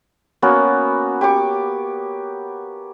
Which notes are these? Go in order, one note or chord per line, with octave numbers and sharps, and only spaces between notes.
A#3 B3 C#4 F#4
G4 G#5 C#6 D6